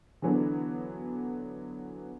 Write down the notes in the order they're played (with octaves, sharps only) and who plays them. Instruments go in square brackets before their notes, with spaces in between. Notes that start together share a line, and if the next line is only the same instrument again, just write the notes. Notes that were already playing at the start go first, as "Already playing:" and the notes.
[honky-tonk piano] D3 E3 F#3 B3 D4